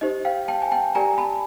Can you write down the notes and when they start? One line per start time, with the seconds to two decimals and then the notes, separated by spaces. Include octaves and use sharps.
0.01 D#4 G4 C5 D#5
0.25 F5 G5
0.48 G5 A5
0.62 G#5
0.71 G5 A5
0.95 G4 A#4 D5 G#5 A#5
1.18 A5 B5